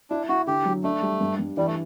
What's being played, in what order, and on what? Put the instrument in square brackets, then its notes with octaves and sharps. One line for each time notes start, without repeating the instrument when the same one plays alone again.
[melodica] D4 [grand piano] E4
[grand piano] E4 [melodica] F#4
[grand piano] D3 [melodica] G4
[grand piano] F#3
[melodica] A3 [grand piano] D4
[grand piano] G3
G2
G2
[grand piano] E3 [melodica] G3
[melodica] A3